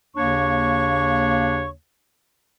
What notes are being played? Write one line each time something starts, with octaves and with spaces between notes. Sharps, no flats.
D#2 C#3 A#3 D4 C#5 C#6